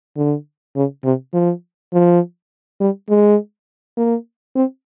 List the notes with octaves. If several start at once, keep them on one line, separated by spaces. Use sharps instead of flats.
D3
C#3
C3
F3
F3
G3
G#3
A#3
C4